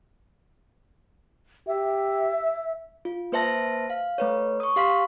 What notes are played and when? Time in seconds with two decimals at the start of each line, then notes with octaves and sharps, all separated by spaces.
1.67 G4 E5
3.05 F4
3.32 A#3 B4 C5 E5 A5 A#6
3.90 F5
4.18 A3 B4 C#5
4.60 C#6 D#6
4.76 G4 F5 C6 B6